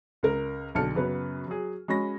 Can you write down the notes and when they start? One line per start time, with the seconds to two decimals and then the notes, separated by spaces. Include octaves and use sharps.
0.23 C#2 A#4
0.75 B1 D3 A5 F6 C#7
0.95 F#2 C#3 B3 B4
1.47 F#3 G#4
1.88 G#3 C#4 F#4 B5 A#6